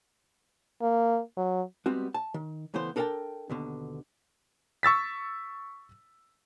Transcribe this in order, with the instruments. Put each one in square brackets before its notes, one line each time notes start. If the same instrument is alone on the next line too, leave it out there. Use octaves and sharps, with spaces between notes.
[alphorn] A#3
F#3
[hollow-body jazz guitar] G3 G#3 B3 C4 F#4
A5
D#3
C#2 E3 A3 B3 C5
D4 A4 A#4 F5 G5 A5
D#2 B2 D3
[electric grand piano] C#6 E6 A6 B6